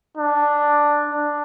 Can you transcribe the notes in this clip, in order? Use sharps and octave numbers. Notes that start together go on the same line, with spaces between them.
D4
D4